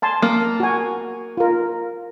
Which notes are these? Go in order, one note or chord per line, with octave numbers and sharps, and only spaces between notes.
G#5 A5 C6
A#3
F#4 G#5
F4 A#4